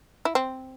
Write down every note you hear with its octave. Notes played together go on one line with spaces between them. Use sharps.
E4
C4